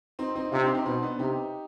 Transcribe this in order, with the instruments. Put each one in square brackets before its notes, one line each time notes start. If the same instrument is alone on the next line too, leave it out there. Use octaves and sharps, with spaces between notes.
[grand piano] C4 D#4
C4 D#4
[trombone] C3 [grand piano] D4 F4
[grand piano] D#4 G4
C4 D#4
[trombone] B2 [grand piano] C4 D#4
[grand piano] B3 D4
[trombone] C3 [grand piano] D#4 G4